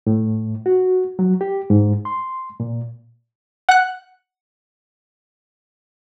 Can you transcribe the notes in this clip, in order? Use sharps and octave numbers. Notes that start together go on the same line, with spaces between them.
A2
F#4
F#3
G4
G#2
C6
A#2
F#5 F#6